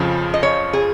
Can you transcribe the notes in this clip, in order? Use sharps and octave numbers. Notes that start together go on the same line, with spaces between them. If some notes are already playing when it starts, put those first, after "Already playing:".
Already playing: F2 C#3 F3
D#5
C#5
G#4